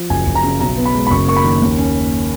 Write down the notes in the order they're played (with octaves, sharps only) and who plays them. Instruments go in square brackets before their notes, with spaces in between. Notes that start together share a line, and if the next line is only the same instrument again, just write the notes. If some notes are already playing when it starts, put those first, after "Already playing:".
Already playing: [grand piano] F3
F#1 G#5
F#1
A#5
C#3
B1 A#5
B3
B5
G#3
B5
F#1 C#6
A#3 C#6
B5
D#3
D#2
C#4